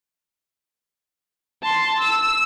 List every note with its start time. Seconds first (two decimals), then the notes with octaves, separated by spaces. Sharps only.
1.62 A5 C6
2.00 E6